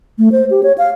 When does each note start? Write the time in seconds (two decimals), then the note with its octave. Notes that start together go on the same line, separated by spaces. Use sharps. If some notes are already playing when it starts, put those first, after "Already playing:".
0.18 A3
0.32 C5
0.50 G4
0.63 C#5
0.78 F5